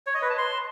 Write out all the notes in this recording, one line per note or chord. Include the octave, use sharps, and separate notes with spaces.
C#5
D#5
B4
A5
C6